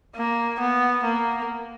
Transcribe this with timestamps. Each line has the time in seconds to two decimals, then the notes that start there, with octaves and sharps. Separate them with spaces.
0.16 A#3
0.60 B3
1.03 A#3